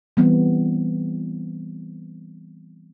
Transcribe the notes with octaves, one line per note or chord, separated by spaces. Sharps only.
E3 G3 B3 C4